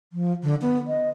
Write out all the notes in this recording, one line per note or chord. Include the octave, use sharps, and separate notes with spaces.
F3
D3
B3
D#5